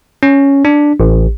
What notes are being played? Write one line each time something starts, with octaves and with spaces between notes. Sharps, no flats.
C#4
D4
A1